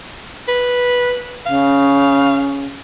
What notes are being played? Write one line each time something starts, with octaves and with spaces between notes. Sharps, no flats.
B4
C#3 F5